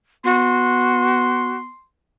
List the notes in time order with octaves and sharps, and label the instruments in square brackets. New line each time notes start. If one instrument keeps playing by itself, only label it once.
[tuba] B3 [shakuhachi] F#4 [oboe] C6